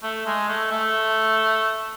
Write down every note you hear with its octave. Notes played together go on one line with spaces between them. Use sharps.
A3
G#3
A3
A3